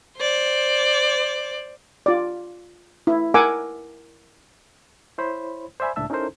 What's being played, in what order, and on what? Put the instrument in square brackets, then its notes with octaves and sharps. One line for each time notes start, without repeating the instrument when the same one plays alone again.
[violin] C5 D5
[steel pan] F4 D5
E4
A#4 F#5 G#5 D6 E6
[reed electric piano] E4 C5 C#5 B5
C5 D5 E5 G#5 B5
C#2 A2 D4 E5 A5 E6
C#4 D#4 E4 A4 A#4 C5